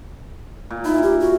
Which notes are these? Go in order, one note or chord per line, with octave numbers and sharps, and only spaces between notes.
A#2
D#4 E4
G4
F#4